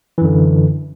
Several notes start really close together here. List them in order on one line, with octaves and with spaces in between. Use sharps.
E3 F#2 D3